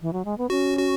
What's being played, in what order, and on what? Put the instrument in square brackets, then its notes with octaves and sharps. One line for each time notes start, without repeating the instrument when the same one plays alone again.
[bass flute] E3
F#3
G#3
B3
[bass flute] C#4 [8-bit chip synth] F#4
[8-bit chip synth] F#4